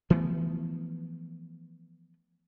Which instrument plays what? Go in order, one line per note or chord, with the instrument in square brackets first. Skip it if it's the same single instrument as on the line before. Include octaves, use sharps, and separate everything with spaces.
[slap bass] E3 F3 A3 B3